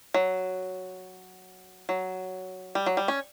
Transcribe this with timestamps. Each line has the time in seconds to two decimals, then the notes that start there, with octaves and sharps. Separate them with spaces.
0.14 F#3
1.89 F#3
2.75 G3
2.86 F#3
2.97 G3
3.08 C#4